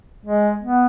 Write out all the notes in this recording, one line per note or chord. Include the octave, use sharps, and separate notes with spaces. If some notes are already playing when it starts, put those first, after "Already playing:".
G#3
B3